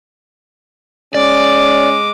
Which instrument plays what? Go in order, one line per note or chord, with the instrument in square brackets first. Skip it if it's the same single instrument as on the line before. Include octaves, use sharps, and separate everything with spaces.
[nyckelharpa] G#3 D6 [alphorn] C#4 [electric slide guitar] D5